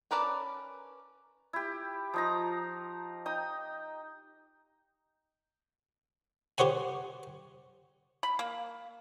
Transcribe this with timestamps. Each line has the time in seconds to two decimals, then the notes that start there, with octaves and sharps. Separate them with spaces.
0.11 C#4 A#4 B4 D5 A5
1.53 E4 G4
2.14 F3 D#4 A#5
3.26 D#4 G5 D#6
6.58 G4 C5 C#5 F#5 G#5
8.23 B5
8.39 A#3